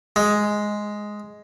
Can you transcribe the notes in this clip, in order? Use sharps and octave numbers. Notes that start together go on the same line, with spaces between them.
G#3